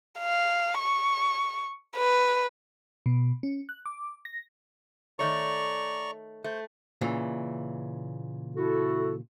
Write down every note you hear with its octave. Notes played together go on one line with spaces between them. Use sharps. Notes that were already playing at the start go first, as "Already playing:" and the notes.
F5
C#6
B4
B2
C#4
F#6
D6
A#6
D#3 A3 C#5 D5 A#5 C#6
A3 C5
A#2 C#3 E3
E4 F#4 A4